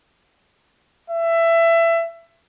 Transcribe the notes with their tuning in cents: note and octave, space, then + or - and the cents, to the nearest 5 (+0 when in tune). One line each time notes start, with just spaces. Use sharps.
E5 +20